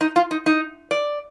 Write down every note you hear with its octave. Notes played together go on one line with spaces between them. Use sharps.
D#4
F4
D#4
D#4
D5